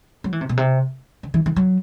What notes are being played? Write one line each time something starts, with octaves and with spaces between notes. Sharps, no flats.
F#3
E3
C3
B2
C3
D3
E3
E3
F#3